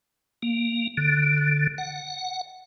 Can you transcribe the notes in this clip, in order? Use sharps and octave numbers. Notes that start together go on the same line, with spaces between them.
A#3
D3
F#5